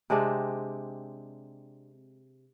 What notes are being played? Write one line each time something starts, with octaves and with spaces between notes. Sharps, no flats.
C3 G#3 C4 D4